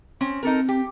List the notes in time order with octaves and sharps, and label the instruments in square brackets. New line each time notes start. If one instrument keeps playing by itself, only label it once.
[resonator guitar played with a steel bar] C4 C#4
[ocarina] C4 [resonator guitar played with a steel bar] D#4 A4 A#4
[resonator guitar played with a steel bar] G4